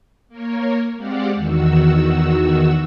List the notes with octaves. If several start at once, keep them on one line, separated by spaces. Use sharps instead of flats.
A#3 A#4 C#5
G#3 C4 G4 D5 F5 F#5
E2 D#3 F#4 E6